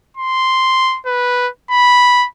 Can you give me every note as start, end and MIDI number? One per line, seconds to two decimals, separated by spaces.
0.17 0.99 84
1.06 1.48 71
1.70 2.27 83